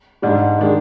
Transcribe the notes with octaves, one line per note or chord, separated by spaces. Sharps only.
G#2 G3 D4
D#3 G#3 D4